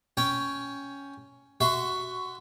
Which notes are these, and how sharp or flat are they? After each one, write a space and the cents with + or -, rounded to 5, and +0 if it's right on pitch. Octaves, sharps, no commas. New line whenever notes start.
C#4 +5 G5 +0
F#4 +5 E5 +0 C6 -20